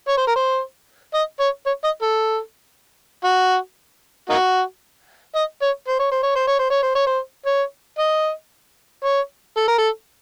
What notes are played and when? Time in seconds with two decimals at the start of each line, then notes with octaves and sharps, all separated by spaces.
0.08 C#5
0.18 C5
0.27 A#4
0.36 C5
1.14 D#5
1.40 C#5
1.66 C#5
1.84 D#5
2.02 A4
3.24 F#4
4.29 A#3 D#4 F#4
5.35 D#5
5.62 C#5
5.88 C5
5.99 C#5
6.11 C5
6.23 C#5
6.35 C5
6.47 C#5
6.59 C5
6.71 C#5
6.83 C5
6.95 C#5
7.07 C5
7.46 C#5
7.99 D#5
9.04 C#5
9.57 A4
9.68 A#4
9.78 A4